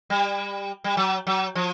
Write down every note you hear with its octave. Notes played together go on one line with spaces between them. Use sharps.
G3
G3
F#3
F#3
F3